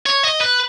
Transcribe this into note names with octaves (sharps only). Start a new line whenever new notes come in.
C#5
D#5
B4